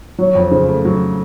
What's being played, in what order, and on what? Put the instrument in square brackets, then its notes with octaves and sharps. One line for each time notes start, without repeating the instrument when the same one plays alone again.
[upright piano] F#3 [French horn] C#5
[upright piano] F2
[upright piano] C#3 [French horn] C5
[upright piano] A3
F#3